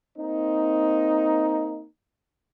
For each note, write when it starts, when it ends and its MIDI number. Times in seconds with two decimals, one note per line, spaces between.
0.17 1.85 58
0.17 1.85 60
0.17 1.85 63